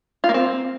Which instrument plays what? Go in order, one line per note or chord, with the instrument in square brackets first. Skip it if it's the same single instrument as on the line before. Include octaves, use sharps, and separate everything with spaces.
[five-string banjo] F4
A#3
C4